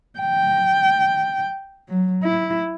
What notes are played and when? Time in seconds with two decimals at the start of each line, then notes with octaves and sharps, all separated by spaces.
0.19 G5
1.89 F#3
2.23 E4